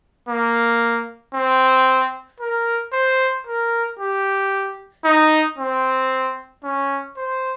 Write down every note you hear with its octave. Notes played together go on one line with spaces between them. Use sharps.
A#3
C4
A#4
C5
A#4
G4
D#4
C4
C#4
C5